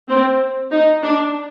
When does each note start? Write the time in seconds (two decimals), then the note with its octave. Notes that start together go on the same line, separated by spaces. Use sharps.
0.09 C4
0.72 D#4
1.03 D4